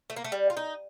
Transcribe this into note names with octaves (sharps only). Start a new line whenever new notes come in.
A3
A#3
A3
G3
F4
D#4